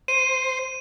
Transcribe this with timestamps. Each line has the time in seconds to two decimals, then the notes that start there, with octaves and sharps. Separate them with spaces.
0.08 C5 D#7